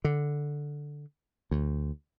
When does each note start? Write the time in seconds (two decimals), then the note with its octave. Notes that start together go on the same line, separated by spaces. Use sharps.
0.04 D3
1.51 D2